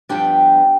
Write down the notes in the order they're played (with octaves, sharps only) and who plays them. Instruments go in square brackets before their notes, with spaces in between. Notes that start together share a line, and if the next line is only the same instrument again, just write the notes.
[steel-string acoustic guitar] G2 F3 B3 D4 G4 G5